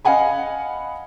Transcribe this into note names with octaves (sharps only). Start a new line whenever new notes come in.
D#5 F5 F#5 G#5 B5